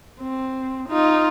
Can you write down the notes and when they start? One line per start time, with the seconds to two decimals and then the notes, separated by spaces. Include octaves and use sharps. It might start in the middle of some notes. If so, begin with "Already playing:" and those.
0.20 C4
0.89 D#4 F4